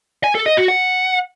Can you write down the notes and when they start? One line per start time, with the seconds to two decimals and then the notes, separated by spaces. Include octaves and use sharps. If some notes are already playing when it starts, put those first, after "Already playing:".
0.24 G#5
0.35 A4
0.46 D#5
0.57 F#4
0.68 F#5